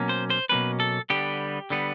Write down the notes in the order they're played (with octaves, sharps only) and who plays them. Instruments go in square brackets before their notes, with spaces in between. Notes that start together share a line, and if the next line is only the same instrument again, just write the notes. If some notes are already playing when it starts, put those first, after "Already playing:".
Already playing: [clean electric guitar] B2 F#3 A#3 C#4
C5
C5
B2 F#3 A#3 C#4 B4
A4
D3 G3 B3 G4
D3 G3 B3